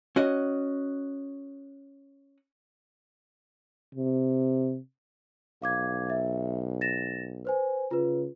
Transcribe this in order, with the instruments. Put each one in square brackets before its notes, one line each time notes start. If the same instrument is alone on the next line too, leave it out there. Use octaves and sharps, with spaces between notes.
[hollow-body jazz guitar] C#4 F#4 D#5
[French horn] C3
[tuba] B1 [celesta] F5 D6 G#6
[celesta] E5
A6 A#6 E7
B4 C5 G#5
[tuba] C#3 [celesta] F4 B4